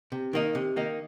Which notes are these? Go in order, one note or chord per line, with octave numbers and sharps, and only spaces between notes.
C3
D#3 A#3 D#4
C3
D#3 A#3 D#4